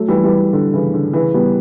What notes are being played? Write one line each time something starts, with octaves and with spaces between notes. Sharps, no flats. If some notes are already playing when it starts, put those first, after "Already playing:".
Already playing: F#3 A3
E3 G3
E3 G3
D3
C#3 E3
D3
C#3 E3
G3 B3